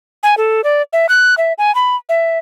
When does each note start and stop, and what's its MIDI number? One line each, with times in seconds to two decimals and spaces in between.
0.23 0.35 80
0.37 0.61 69
0.64 0.82 74
0.93 1.07 76
1.09 1.35 90
1.38 1.53 76
1.58 1.74 80
1.75 1.96 83
2.09 2.38 76